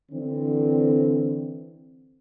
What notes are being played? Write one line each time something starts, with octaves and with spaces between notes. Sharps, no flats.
D3 E3 C4